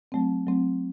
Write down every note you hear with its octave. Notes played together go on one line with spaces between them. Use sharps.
F#3 A3 C4
F#3 A3 C4